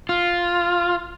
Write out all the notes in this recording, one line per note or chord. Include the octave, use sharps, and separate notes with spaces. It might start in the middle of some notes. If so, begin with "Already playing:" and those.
F4